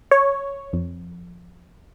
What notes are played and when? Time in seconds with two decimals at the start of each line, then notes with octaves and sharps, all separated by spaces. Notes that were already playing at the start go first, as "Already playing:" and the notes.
0.11 C#5
0.73 F2